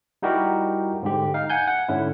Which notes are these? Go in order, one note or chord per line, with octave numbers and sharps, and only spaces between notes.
G3 D#4 E4 F#4 G4 A#4
G#2 D3 G4
D#4 F5
F#5 G#5 G6
F#5
G#2 D3 C#4 E4